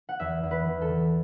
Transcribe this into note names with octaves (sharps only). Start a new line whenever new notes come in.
F#5
E2 E5
E2
B4
E2
A4
E3